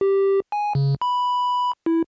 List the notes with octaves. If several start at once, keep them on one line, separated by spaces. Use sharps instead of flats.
G4
G#5
C#3
B5
E4